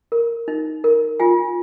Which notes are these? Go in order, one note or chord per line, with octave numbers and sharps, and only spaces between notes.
A#4
D#4
A#4
F4 G#5